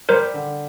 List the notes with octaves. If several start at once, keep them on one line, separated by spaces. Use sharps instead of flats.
G3 A#4 C5
D3